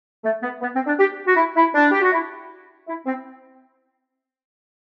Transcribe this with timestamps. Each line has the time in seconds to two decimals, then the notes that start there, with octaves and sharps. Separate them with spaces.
0.24 A3
0.43 B3
0.62 B3
0.75 C4
0.87 D4
0.99 G4
1.28 F#4
1.36 E4
1.56 E4
1.75 D4
1.92 G4
2.02 F#4
2.12 E4
2.88 E4
3.06 C4